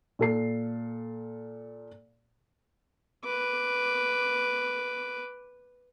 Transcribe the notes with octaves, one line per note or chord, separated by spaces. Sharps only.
A#2 A4 C7
B4 D6